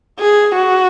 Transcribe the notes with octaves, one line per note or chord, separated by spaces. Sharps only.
G#4
F#4